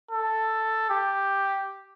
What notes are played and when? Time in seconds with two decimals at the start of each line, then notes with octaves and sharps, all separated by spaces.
0.11 A4
0.90 G4